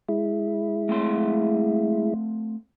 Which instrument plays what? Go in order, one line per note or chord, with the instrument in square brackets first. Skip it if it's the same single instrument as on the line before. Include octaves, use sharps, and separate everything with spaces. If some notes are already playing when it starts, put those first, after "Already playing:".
[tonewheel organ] G#3 E4
[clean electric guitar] A3 C4 C6